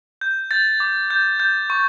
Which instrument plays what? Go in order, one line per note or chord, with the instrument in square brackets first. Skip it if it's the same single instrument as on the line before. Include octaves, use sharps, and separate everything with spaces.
[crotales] G6
G6 A6
D6
G6
G6
C#6